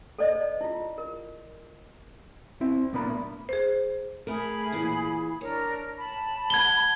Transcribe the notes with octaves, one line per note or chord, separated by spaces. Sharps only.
A4 C5 D5 D#5
E4 F4
A#4
C4 E4
B1 A#2 B3 D4 A#4 B5
A3
G#4 C5
A3 G#4 A#4 B5
A#2 E3
D4 A#4 C#5
A5 B5
G#4 F#5 G#6 G7